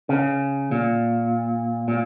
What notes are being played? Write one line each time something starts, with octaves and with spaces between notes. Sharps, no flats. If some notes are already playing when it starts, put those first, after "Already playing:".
C#3
A#2
A#2